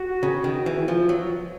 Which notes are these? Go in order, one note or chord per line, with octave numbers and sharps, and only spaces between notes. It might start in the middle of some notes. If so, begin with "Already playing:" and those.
Already playing: F#4
C#3
D#3
E3
F3
F#3